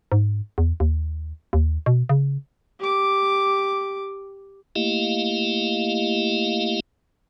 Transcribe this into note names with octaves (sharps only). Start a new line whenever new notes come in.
G#2
E2
D#2
D#2
B2
C#3
G4 D6
A3 A#3 E4 G4 D#5 F5